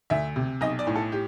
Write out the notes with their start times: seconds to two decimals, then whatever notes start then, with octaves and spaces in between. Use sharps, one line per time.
0.10 D2 E5
0.36 C3
0.61 B1 D#5
0.79 D5
0.87 A2
0.95 A4
1.12 G4